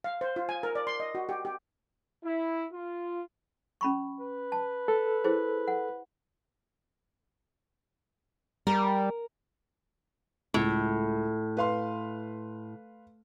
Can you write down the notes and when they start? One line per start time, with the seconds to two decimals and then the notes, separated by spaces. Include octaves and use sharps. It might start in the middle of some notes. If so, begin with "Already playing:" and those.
0.04 F5
0.21 C5
0.36 F4
0.49 G#5
0.63 A#4
0.75 D5
0.87 C6
1.00 D#5
1.15 F#4
1.29 G4
1.45 G4
2.24 E4
2.72 F4
3.81 C#4 B5 C#6
4.20 B4
4.52 A5
4.88 A4
5.24 E4 G#4 C5
5.68 F#5
8.67 G3 A#4
10.54 C#2 A2
11.57 B4 F5 C6